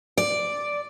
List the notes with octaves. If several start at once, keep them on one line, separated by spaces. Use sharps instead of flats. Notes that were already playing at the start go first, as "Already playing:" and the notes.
D5